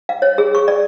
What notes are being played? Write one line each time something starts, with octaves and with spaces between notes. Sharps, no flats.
F5
C#5
G#4
C#6
D5